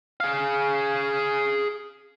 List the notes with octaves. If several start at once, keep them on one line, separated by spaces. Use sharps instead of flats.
G#4 F5